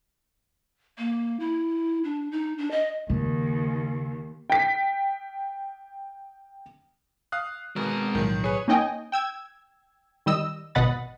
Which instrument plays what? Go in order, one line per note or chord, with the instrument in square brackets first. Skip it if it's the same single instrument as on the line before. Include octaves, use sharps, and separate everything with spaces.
[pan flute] A#3
E4
D4
D#4
D4
D#5
[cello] D#2 [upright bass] C#3
[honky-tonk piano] G5 B6
[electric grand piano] F5 D#6 F#6
[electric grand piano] B2 B3 [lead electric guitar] G#3 A#4
[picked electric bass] B1 A2 F#3 [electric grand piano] D#3 F3
[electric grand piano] G#4 B4 [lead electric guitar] C#5
[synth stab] A#3 C#4 D#4 D#5 G5 G#5
G5 E6 G#6
D#3 G3 D#5 E6
G#1 B2 D#5 F#5 B5 A6